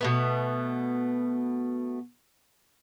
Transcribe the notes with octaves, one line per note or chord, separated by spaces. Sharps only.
B2 A3 B3